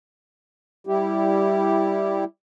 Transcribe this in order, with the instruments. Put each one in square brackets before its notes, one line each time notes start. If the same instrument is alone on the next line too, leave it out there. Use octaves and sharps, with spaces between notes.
[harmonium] G3 E4 G4